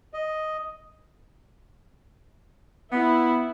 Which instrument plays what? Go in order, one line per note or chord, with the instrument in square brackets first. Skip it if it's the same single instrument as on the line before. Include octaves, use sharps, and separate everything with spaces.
[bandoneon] D#5
[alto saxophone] B3 [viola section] E4